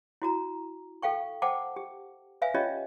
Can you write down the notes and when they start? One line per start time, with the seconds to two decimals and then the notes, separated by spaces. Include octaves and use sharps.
0.22 E4 F#4 A#5
1.02 A4 F5 G5 C#6
1.42 C5 F#5 G5 A5 D6
1.76 G4
2.42 B4 E5 F5 G#5
2.54 C#4 F4 G4 C#5 D#5